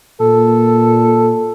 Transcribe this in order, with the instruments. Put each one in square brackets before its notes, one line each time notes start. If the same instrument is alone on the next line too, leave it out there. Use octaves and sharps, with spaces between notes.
[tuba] A#2 [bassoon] A4